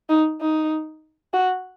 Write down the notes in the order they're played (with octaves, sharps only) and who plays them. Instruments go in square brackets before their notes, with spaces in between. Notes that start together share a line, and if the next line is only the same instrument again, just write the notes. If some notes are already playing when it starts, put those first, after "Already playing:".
[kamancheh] D#4
D#4
F#4